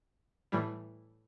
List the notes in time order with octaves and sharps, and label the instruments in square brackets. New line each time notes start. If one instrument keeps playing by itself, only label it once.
[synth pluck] A2 E3 G3